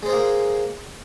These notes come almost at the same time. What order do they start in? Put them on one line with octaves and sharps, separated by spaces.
G#3 C5 G#4 A#3